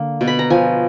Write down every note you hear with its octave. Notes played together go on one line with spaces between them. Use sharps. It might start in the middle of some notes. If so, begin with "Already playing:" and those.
Already playing: D3 A#3
B2
B5
A#5
F3 G#5